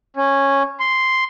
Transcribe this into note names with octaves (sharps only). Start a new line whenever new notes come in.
C#4
C6